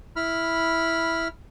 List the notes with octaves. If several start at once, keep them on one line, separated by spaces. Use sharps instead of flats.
E4 B5 F6